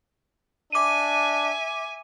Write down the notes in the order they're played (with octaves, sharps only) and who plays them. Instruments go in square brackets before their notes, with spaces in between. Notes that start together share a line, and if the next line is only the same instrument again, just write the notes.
[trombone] D4 [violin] E5 G#5 [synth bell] D6 D#7